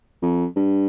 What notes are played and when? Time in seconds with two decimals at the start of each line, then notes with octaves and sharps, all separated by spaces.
0.23 F2
0.57 G2